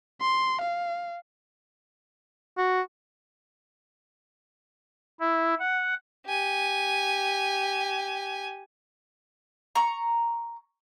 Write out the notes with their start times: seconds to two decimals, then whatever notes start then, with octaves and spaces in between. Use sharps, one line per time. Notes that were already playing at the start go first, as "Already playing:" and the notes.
0.21 C6
0.62 F5
2.58 F#4
5.20 E4
5.59 F#5
6.27 G4 G#5
9.75 A#5 C#6